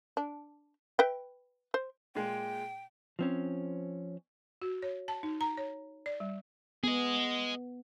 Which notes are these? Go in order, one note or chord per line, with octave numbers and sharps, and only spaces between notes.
D4
B4 E5 G5
C5
A#2 G#3 G5
F3 C4 C#4
F#4
C#5
A5
D#4
A#5
C#5
D5
G3
B3 G#4 D#5